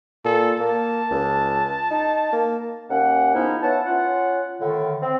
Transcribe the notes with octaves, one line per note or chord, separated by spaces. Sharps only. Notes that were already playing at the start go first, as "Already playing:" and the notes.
A#2 A4
A#3 A5
C#2
D#4
A#3
D#2 A#3 C#4 F#5
G#2 F3 B3 C#4 D#4 E4
B4 C#5 E5 F#5 A5
C#4 F4 F#5
A2 D3 D#3
C4